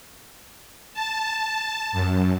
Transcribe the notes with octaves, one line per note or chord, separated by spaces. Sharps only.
A5
F#2